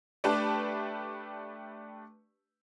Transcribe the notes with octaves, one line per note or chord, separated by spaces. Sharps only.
A3 D4 G4 B4 D5 A5